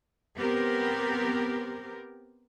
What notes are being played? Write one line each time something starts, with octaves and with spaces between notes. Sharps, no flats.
B3 C4 G4 A#4